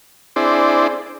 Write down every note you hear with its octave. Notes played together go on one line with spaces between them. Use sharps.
C4 D4 E4 G#4 C5 D5